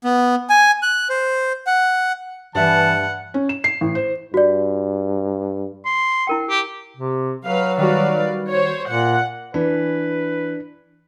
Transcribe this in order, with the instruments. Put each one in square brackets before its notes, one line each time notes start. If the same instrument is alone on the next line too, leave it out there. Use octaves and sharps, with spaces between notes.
[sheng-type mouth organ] B3
G#5
F#6
C5
F#5
[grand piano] G2 E5 [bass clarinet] E3 [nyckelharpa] F#5 [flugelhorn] A5
[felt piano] C#4
E7
C7
A1
C5
[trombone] G2 [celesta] F#4 D5
[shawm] C6
[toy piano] E4 A#4 G5
[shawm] G4
[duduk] C3
[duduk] F#3 [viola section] B4 F5
[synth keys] D#3 G3 F#4 [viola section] B4 D5 F5
[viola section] C5 C#5
[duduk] A#2 [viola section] F#5
[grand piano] E3 [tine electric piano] D4 [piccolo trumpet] B4